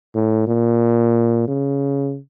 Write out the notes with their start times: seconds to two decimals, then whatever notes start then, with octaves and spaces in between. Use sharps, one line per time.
0.15 A2
0.47 A#2
1.48 C#3